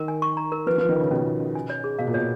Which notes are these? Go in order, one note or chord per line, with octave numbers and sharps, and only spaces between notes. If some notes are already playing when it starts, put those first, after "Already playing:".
Already playing: D#3 A#4
G#5
C#6
A#5
A#4
F3 B4
F3 B4
D#3
C#3 F4
B2 C#4
C#4
C#4
G#5
C#5
G#4
B2 F5
A#2
B2 C#5